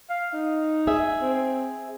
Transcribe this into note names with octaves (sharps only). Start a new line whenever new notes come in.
F5
D#4
G#4 E5
C4